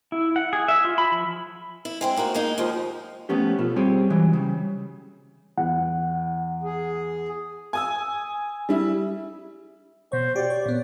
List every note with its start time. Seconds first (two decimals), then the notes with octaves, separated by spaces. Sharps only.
0.12 E4
0.36 F#5
0.53 G#4
0.68 E5
0.85 F4
0.98 B5
1.12 F3
1.85 E4
2.01 G#3 C4 E4
2.16 A2 A#3 D#4 F#4
2.34 G#3 A#3 D#4
2.58 D#2 F3 G#3 C5
3.29 F3 A3 B3 C#4 G4
3.58 B2 F4 A4
3.76 G3 C4 G4 G#4 C#5
4.10 E3 F#3 G#3
4.33 C#3 G3
5.58 E2 F#5
6.63 G#4
7.73 G#5 D#6 E6
8.69 G3 E4
10.12 B2 C5 C#5
10.36 F#4 G4 D5
10.50 C#5
10.66 A#2 B3